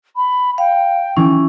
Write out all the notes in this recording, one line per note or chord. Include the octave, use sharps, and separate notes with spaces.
B5
F5 G5
E3 C#4